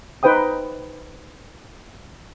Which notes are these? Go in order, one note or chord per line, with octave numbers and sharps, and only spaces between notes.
D#4 B4 C5 G5 D#6